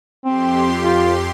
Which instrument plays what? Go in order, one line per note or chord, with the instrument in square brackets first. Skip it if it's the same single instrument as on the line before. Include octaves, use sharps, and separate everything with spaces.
[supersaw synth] F2 G4 C6 [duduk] C4
[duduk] F4